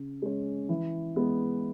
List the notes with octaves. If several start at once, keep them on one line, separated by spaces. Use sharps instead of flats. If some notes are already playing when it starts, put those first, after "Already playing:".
Already playing: C#3
G#3 C#4
E3
G#3 B3